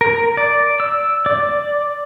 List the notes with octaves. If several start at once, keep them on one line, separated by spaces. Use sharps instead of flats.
A#4
D5
E6
D5